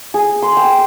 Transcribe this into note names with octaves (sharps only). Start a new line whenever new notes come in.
G#4
C6
G5